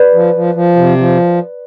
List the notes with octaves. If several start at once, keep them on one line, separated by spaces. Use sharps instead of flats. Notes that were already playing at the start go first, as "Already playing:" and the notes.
Already playing: B4 D5
F3
F3
F3
C3
F3